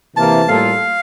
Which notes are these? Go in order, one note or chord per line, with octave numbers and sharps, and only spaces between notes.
C3 E3 A#3 A5
A2 G3 A#3 F4 A4 F5